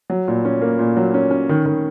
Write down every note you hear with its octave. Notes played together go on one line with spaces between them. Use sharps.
F#3
A#2
C#4
A#3
A#2
F#3
C#4
C#4
D#3
D#3